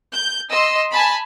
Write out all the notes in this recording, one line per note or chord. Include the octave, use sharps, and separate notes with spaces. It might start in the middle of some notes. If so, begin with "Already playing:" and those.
G6
D#5 C6 E6
G#5 A5 B5